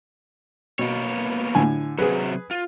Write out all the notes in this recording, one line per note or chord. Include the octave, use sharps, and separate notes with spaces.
B2 A#3 B3 C#5
A2 D3 G#5
C3 F#3 G#4 B4
F4